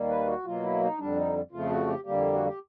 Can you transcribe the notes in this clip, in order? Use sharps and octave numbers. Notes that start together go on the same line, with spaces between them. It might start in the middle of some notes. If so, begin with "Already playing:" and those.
Already playing: D#2 D#3 G3 A#3
B4
F#4
B2 F#3 A#3 F4
E4
D#4
F2 D3 G3 D4
D#4
F2 C#3 F3 A3 F4
F#4
G4
F2 D3 G3 A#3 G4
F#4
G4